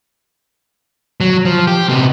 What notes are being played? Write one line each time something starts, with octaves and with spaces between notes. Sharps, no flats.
F#3
F3
G4
C3 B3